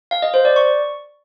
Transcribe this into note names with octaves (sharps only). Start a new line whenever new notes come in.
F5
D#5
C5
D5
C#6